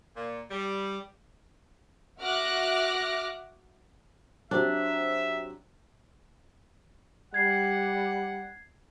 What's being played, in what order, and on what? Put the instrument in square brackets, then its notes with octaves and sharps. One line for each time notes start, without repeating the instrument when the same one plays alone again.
[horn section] A#2
G3
[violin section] F#4 E5 D6 F6 F#6 A#6
[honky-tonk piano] F#3 C4 G4 [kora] D4 [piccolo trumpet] E5
[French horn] G3 [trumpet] F#5 [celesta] G#6 C7